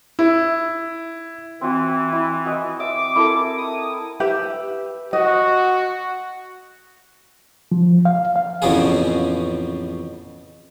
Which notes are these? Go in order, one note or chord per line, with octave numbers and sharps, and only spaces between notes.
E4
E3 C4 F#4
E4
F#4 D#5 G#5
E5 D6
E4 A4 A#4
D#6
G4 B4 E5
F#4 D#5
F3
F5
F5
A1 F2 C#3 B3 G#4